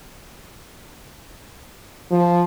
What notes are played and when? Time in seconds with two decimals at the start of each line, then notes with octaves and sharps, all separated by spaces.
2.11 F3